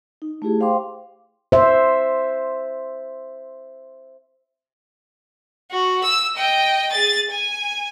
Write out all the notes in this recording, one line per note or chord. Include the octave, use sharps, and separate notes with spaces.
D#4
A3 E4 G4 G#4
C5 F5 G5 C6 D6
C5 E5
F#4
E6
D#5 G5
G#4 A6
G#5